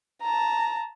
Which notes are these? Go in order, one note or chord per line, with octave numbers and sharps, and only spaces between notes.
A5 A#5